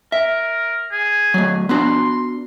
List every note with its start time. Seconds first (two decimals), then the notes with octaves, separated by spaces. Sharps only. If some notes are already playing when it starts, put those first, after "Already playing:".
0.12 A#4 E5
0.92 G#4
1.34 F#3 A3
1.69 B3 D4 F#4 C6